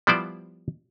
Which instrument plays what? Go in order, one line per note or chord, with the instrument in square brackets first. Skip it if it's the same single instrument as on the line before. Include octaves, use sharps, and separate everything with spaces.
[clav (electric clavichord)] F3 G3 B3 E4 C5 D5